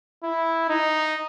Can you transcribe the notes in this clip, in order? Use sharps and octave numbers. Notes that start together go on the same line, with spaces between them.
E4
D#4